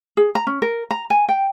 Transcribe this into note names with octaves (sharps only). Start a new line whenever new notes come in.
G#4
A#5
C#4
A#4
A#5
G#5
G5